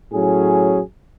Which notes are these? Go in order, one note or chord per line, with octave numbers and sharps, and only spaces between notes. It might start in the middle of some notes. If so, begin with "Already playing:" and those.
A2 F#3 C#4 G#4